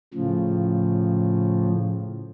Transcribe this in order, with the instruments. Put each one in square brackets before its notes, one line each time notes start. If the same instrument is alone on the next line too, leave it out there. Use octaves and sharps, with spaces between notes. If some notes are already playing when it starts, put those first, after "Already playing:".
[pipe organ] A2 C#3 F3